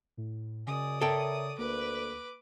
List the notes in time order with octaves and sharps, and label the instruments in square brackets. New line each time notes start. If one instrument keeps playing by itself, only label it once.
[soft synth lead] A2
[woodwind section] F#2 G#3 G#5 [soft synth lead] C#3 [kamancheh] D5 D#6
[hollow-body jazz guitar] A4 G5 [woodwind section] A#4 C#5 E5
[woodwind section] D2 [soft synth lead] A#3 [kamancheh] B4 D6